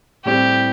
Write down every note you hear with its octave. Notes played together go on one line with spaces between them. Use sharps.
A2 G3 C4 G4